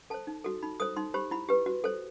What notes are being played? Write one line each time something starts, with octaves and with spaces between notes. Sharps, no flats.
A4 C5 A5
D#4
F#4 A4
D#4 B5
A4 C5 D#6
D#4 C6
G4 C5 B5
E4 B5
G4 B4
F#4
A4 C5